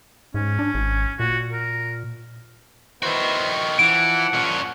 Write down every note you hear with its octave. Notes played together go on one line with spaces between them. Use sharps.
G#2 C#4
D4
G#1
A#2 F#4
A#4
D#3 B3 E4 F#4 C5
E3 F3 F#5 D7
A#2 C#4